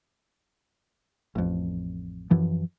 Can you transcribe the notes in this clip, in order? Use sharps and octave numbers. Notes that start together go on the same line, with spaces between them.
A1 F2
F#2 E3 F3